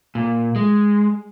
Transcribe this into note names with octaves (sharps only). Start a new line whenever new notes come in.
A#2
G#3